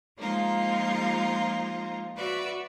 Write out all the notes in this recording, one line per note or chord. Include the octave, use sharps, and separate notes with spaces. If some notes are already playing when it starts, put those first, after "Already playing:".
F3 G#3 A#3 D#4 F4
F#4 B4 D5 E5